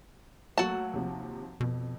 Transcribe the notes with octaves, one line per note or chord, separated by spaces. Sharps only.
F#3 A3 A#3 F#4 A5
D#2 C3 F3
F2 B2